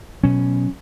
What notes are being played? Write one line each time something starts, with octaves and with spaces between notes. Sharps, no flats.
B2 F#3 C#4